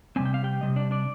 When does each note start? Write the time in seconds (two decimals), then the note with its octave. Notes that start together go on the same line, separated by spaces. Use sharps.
0.16 C3 G3 C4 G#5
0.26 G5
0.34 F5
0.44 G4 G5
0.61 C3 G3 D#5
0.76 D4 D5
0.91 D4 D5